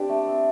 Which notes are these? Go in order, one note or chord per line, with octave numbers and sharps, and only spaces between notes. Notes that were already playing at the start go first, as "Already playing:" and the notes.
Already playing: C4 D4 G4
A3
C4